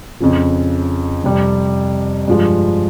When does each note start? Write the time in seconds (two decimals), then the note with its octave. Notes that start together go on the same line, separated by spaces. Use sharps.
0.20 F2 C#3 F3
1.24 F2 C3 G3
2.28 G2 F3 G#3